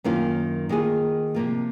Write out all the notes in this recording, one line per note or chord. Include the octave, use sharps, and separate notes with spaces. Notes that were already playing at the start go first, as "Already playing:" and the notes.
F#2 D#3 A#3 C#4 F4
D#3 A#3 F4 G#4
C3 F3 A#3 F4